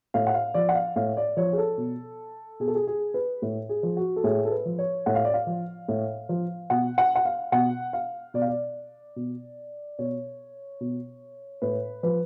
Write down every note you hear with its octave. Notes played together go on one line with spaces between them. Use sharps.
A2 F5
F#5
F5
F3 D5
F#5
F5
A2 F5
D5
F3 C#5
G#4
A4
B2
B2 G#4
A4
G#4
G#4
B4
A2
G#4
F3
F#4
A4
A2 G#4
A4
B4
F3
C#5
A2 F#5
F5
D5
F5
F3
A2
F3
B2 F#5
F#5
F#5
F5
B2 F#5
F5
B2 D5
F5
D5
B2
B2 C#5
B2
A2 B4
F3 B4